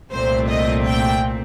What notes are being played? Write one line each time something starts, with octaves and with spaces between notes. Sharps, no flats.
C2 A#2 A3 C4 C5
D#5
G5